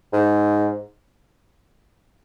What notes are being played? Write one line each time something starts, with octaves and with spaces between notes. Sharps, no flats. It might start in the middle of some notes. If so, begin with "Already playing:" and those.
G#2